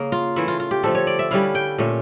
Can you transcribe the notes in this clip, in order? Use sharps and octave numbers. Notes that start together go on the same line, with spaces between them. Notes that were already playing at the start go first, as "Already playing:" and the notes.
Already playing: C#3 A#3
F4
E3 A3 E4
F4
F4
G4
D3 F3 A3 A4
C#5
D5
E5
D3 G3 C#4 E4 F5
G5
A#2 A3 C#4